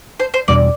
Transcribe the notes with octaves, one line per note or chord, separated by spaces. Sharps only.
C5
C5
E2 B2 G3 D4 D5